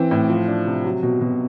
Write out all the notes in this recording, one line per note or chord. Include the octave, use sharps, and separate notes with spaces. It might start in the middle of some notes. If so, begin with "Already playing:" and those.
Already playing: E3 C4
A2
F3
D4
C3
F#3
B2
B2